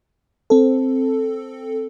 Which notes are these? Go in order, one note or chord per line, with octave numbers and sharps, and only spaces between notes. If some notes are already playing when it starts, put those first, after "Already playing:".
C4 A4